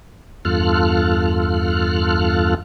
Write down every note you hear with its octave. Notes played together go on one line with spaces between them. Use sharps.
E2 G2 F4 A4 F6 F#6